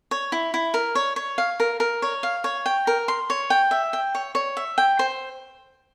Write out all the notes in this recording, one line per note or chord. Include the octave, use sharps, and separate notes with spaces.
C#5
E4
E4
A#4
C#5
C#5
F5
A#4
A#4
C#5
F5
C#5
G5
A#4
C6
C#5
G5
E5
G5
C#5
C#5
E5
G5
C5